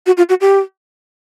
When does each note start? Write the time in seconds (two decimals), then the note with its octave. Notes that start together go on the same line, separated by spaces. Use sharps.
0.06 F#4
0.17 F4
0.29 F#4
0.41 G4